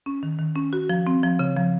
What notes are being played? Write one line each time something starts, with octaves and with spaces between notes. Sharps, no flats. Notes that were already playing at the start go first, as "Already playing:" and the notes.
C#4
D#3
D#3
C#4
F#4
F3
C4
F3
C#3
F3